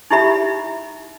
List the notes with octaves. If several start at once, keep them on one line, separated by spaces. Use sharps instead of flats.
D#4 E4 G4 E5 B5